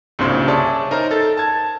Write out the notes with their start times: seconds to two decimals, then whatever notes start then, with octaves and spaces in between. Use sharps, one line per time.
0.19 C2 G2 A#2 C#3 C5 C6
0.48 G#4 C#5 D5 E5 A5
0.91 D#4 A#4 C5 A#5
1.11 A4 A6
1.37 A5 G#6